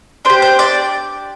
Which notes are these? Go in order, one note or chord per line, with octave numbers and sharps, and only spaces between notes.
D4 G4 C5
C5
D5